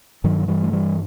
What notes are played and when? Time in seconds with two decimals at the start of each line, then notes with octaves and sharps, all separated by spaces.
0.24 G2 D#3 F#3
0.48 E3 G3
0.63 A3
0.73 E3 G3